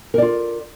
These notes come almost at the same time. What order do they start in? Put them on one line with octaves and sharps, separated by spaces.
A#4 D5 F4